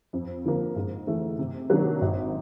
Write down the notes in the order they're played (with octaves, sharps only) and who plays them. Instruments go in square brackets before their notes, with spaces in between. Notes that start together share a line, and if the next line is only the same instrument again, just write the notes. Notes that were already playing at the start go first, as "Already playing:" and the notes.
[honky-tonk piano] F2
D3 F3 A#3
G#2
E3 A3
C3
D#3 F#3 A#3 D4
G#1